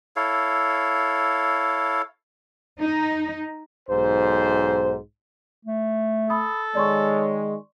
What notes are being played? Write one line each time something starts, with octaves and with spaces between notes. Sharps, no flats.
E4 A4 C#5 F5
D#4
B1 G#2 C5
A3
A4 B5 D#6
D#3 G#3 C#5 D5 C6 C#6